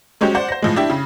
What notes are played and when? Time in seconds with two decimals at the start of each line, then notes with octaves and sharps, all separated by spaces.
0.21 F#3 G#3 C#4 G4 C5
0.35 C5 D5 F#5
0.49 C5 A#6
0.62 A2 F3 G#3
0.76 D4 E4 G4
0.90 C#3